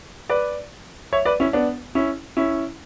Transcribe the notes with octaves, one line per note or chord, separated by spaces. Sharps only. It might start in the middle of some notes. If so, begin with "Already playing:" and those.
B4 D5
C#5 E5
B4 D5
C#4 E4
B3 D4
C#4 E4
C#4 E4